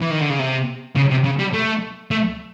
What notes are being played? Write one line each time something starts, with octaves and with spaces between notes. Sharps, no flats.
E3
D#3
D3
C#3
C3
C#3
C3
C#3
G3
A3
A3